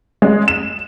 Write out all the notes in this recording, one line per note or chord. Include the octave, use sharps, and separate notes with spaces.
G#3
E7